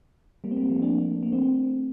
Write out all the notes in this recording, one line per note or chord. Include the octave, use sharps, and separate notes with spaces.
G3 A#3
C4
G3 A#3
F3 A3
A#3 D4
A#3
A3 C4